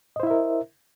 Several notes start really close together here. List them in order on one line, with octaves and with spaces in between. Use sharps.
D#5 C5 E4 E5 A#4